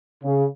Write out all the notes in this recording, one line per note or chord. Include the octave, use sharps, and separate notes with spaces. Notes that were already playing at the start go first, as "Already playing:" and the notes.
C#3